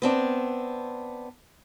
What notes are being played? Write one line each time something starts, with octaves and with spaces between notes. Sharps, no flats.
B3 C4 D4